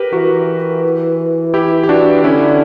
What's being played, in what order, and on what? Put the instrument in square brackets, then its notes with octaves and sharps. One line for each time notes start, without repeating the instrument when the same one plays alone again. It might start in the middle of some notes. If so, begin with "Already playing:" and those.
Already playing: [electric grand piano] G4 A#4 B4
[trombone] E3 [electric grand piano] F#4 A#4
[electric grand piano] E4 G4
G4
D4 F#4
[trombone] D3 [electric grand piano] C#4 E4